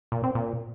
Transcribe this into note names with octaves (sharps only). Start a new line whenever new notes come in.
A#2
C4
A#2